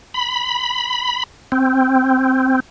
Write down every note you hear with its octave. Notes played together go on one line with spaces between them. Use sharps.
B5
C4